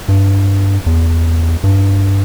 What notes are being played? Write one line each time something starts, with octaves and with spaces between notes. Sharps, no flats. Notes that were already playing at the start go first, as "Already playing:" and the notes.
G2
E2
G2